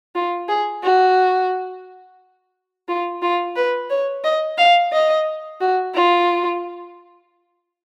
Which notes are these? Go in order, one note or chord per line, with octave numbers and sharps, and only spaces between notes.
F4
G#4
F#4
F4
F4
B4
C#5
D#5
F5
D#5
F#4
F4